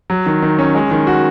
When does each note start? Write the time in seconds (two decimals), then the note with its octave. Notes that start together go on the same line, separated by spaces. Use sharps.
0.10 F#3
0.26 D#3
0.42 D#3
0.59 C#4
0.75 G#3
0.91 D#3
1.07 F#4